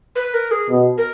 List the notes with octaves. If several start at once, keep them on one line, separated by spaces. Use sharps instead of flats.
B4
A#4
G#4
B2
A#4